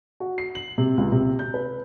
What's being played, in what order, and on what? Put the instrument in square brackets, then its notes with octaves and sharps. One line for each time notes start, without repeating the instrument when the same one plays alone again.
[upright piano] F#4
C7
F#7
C3
C#2
C3
G6
B4